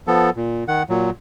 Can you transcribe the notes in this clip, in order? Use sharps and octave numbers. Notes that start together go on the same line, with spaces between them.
F3 B3 A4
A#2
D#3 F#5
A#2 F#3